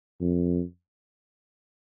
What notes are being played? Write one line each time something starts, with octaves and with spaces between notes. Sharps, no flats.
F2